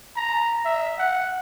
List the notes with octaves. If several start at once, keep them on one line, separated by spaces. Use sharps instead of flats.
A#5
E5
F#5